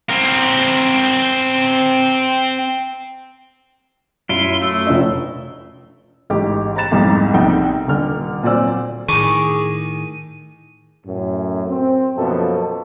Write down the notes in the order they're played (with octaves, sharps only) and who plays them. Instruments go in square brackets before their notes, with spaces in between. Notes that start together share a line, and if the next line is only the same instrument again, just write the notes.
[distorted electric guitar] C4 A#4
[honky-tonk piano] F#2 [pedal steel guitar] E4 F4 [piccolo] G7
[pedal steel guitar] A3 [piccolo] E6
[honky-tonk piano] F1 C#4 D#5
[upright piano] A1 G#2 G4
A#5 B5 A6 E7
C2 F2 G#2 C3
A#1 C3 D#4 F#5 G5
D#1 D3 F6
A#2 F#3 C4 D5 E6
[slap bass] A2 D#3 [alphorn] G#4 [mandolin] C#6 D6 [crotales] D#7
[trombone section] F#2 A2
C4
F#2 B2 F3 A#3 A4